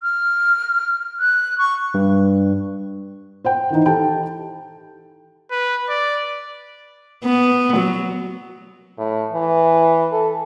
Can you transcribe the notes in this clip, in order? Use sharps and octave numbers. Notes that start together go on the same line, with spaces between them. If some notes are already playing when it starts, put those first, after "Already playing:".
F6
F#6
C#6
G2
C5 F#5 G5
D#3 E3 D#4
G4 A4 G5 A5
B4
D5
B3
F#3
A2
E3
A4